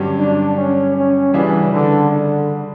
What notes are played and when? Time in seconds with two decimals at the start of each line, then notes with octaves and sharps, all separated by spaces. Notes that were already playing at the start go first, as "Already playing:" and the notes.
Already playing: G2 D3 F#3 C#4 G4
0.19 D4
0.57 C#4
0.96 C#4
1.34 C#3 E3 G3 D4 F#4
1.73 D3
2.10 D3